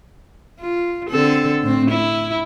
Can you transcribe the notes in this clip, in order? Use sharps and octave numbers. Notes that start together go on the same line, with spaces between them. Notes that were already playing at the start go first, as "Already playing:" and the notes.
F4
D3 C4 A4
A2 C4
E4